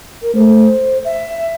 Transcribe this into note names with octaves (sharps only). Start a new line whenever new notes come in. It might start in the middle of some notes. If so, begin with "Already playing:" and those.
A#4
A3 C5
E5